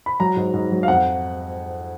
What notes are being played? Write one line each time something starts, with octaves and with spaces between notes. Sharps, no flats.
B5
F#3 A#5
G#2
G#2
F#3
F5
F2 F#5